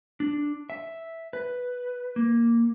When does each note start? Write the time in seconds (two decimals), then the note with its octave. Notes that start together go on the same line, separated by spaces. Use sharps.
0.20 D4
0.70 E5
1.33 B4
2.16 A#3